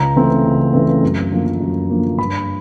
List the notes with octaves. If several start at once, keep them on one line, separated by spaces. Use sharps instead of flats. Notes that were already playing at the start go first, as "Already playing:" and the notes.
Already playing: C#2 A#5
C#3 E3 A3 C4
C#2
C#3 E3 A3 C4
F#2
D3 F3 A#3
F#2
D3 F3 A#3
G2 B5